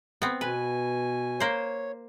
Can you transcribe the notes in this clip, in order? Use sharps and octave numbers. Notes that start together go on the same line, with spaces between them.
B3 C4
B2 B4 G#5
A#3 C5 C#5